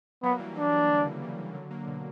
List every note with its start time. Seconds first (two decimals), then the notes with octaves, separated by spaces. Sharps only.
0.23 F#3 A#3 B3
0.39 E3 G3
0.56 F#3 A#3 D4
0.73 E3 G3
0.89 D3 F#3
1.05 C#3 E3
1.22 E3 G3
1.38 C#3 E3
1.54 D3 F#3
1.71 F#3 A#3
1.87 B2 D3